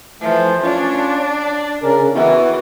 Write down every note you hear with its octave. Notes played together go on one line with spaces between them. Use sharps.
E3 F3 A3
C#4 D4 F4 C#5
D5
C#3 C#4 A#4
E3 B3 E4 F#4